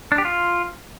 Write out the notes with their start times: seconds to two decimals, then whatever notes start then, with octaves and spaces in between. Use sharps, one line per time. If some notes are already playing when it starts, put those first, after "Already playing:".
0.12 D4
0.18 G4
0.25 F4